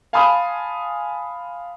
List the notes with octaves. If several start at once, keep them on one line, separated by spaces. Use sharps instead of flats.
F5 G#5 A5 B5 C6 D#6